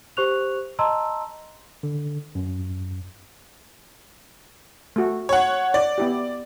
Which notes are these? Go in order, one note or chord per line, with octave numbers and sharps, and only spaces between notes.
G4 C5 C#6 F#6 F7
D#5 A5 A#5 C6 E6
D3
F#2
A3 F#4
C#5 F#5
D5
B3 E4 G4